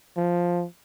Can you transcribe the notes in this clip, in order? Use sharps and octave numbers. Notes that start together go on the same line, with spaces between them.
F3